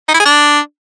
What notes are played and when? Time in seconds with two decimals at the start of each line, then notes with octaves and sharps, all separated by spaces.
0.09 D#4
0.14 E4
0.20 G#4
0.25 D4